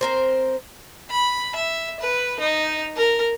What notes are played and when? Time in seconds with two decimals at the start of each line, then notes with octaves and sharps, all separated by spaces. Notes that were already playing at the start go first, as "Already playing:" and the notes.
0.01 C4 A#4 C5
1.10 B5
1.56 E5
2.00 B4
2.40 D#4
2.97 A#4